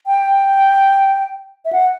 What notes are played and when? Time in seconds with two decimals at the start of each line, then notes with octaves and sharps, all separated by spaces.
0.07 G5
1.65 E5
1.73 F#5